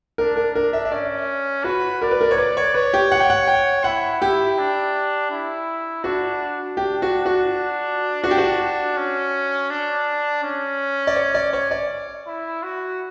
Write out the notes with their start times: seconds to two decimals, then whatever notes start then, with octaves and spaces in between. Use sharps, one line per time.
0.18 D4 A#4
0.37 A#4
0.55 D4 A#4
0.73 E5
0.85 E5
0.92 C#4 D5
1.64 F#4 B4
2.02 A#4 D5
2.11 B4
2.21 A#4
2.31 C#5
2.38 B4 D5
2.57 C#5
2.74 B4 C#5
2.94 G4
3.12 F#5
3.20 G5
3.30 F#5
3.48 G5
3.84 E4 F#5
4.21 E4 G4
4.58 D4
5.30 E4
6.03 D4 F#4
6.77 D4 G4
7.02 F#4
7.26 F#4
8.24 D4 F#4
8.31 G4
8.38 F#4
8.61 D4
8.97 C#4
9.70 D4
10.43 C#4
11.07 D5
11.16 C#5
11.35 D5
11.53 C#5
11.71 D5
12.26 E4
12.63 F#4